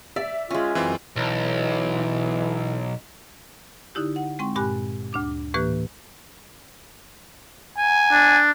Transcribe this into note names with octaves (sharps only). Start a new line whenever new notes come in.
D5 E5
G#3 C#4 F4
F#2 E3 C4 F4
B1 E3
D3 D#4 E4 G4
F#5
G#3 C4 G5 C6 C#6
G2 A#2 G4 G#5 B5 F#6
D2 D4 D6
A2 E3 A#3 G4 B4 F#6
G#5
D4